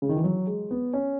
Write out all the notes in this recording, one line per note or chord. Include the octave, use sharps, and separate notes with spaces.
C#3
D#3
E3
F#3
G#3
B3
C#4